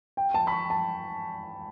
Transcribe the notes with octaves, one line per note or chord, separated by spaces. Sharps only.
G5
A5
B5
C#6
A5